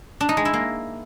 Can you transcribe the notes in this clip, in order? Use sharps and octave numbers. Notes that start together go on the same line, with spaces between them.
D4
D#4
G#3
E4
A#3